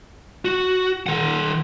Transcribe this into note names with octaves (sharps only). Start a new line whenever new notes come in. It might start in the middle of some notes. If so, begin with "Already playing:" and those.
F#4
D#3 F#5